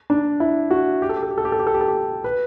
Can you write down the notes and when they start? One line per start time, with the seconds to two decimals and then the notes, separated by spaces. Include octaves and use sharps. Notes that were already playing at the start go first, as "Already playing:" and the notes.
0.10 D4
0.40 E4
0.71 F#4
1.02 G4
1.09 A4
1.17 G4
1.23 A4
1.31 G4
1.38 A4
1.45 G4
1.52 A4
1.59 G4
1.67 A4
1.74 G4
1.81 A4
1.88 G4
2.24 B4